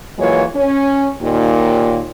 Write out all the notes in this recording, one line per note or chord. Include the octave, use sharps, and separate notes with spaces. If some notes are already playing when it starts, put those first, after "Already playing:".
E3 F#3 G#3 A#3 F4 C#5
C#4
D#2 A#2